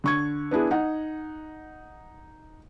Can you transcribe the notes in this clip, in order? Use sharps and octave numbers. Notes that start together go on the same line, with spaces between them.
D3 C#6 G#6
B3 D4 E4 G#4
D#4 F#5